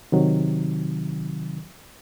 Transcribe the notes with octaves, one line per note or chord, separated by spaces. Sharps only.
C3 D#3 F#3